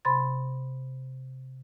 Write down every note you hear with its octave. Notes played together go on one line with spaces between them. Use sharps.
C3 B5 C6 A6